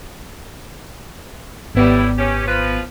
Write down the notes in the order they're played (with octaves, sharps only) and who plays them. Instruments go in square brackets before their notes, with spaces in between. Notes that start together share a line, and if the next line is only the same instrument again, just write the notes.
[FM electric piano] G#1 B3 [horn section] A2 G3 E4
[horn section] C#4 G4
F3 B4